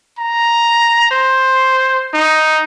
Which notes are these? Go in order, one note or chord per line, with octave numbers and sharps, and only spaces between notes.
A#5
C5
D#4